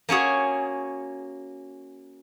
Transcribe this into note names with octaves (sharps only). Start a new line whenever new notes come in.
A#3 C#4 F#4 G#4